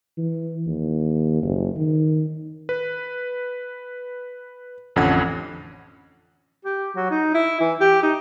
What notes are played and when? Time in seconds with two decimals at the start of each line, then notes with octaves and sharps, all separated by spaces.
0.18 E3
0.67 D#2
1.43 F#1
1.78 D#3
2.69 B4
4.96 A1 F2 D3 C#4 F#5 G#6
6.65 G4
6.96 F#3
7.10 D#4
7.34 E4
7.60 E3
7.80 G4
8.02 D#4